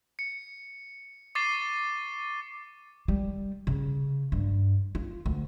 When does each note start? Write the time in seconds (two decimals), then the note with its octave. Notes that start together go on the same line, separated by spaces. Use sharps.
0.19 C#7
1.35 C#6 D6 A6 C7 D#7 G7
3.08 G3
3.67 C#3
4.32 G2
4.95 F4
5.26 D2